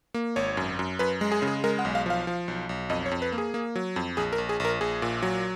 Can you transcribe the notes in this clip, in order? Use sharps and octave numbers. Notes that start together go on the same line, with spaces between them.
A#3
G#1 C#5
F#2
F#2
F#2 B4
G#3
G#4
C#3
G#4
G#3 A#4
F#5
B1
F5
F3 F5
F3
B1
B1
F2 D#5
C#5
F2
B4
A#3
G#4
A#3
F#3
F2
A#1 G#4
A#4
A#1
G#4
A#1 A#4
A#1 G#4
A#2
F#3